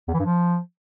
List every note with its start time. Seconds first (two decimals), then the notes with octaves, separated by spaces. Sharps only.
0.08 E2
0.14 E3
0.20 G2
0.25 F3